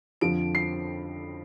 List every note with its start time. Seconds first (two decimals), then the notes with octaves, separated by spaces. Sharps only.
0.21 F2 D3 F3 D7
0.55 C7